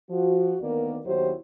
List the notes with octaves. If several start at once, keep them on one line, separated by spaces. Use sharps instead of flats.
F3 F#4
D2 D#3 A#3 B3 A#4 D5
D#2 B2 F#3 E4 G4 C5